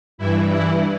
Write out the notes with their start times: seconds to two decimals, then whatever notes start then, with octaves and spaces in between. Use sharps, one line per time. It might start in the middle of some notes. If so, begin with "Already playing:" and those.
0.18 G2 E3 E4
0.51 E4